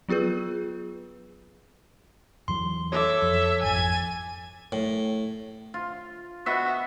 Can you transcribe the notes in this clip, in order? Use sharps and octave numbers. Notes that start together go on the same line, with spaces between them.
F#3 B3 F4 G#4 B4
E2 E3 F#3 C6
A4 C#5 E5 D6
F2
G#1 F2 G#5 G#6 A6
A2
F4
B3 F#4 D#5 E5